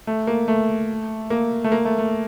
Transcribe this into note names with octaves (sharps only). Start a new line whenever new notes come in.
A3
A#3
A3
A#3
A3
A#3
A3
A3